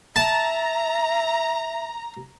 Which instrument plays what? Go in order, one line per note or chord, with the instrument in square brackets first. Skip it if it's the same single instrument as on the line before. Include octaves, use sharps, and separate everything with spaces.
[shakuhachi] E5 [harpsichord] A5 [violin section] A#5